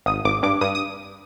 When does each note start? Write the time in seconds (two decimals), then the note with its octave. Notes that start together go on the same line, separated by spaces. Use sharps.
0.06 G#1 D#6
0.24 G#1 D6
0.43 G2 D6
0.61 G2 D#6
0.75 D#6